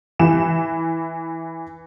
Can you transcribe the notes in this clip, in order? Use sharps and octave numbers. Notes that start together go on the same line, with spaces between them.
E3 E7